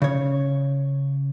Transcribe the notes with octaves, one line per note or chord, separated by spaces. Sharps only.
C#3 C#5